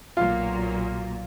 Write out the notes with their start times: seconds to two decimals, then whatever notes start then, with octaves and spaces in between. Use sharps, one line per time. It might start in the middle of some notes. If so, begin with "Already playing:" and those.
0.17 B1 A#2 F#3 A#3 F4 F5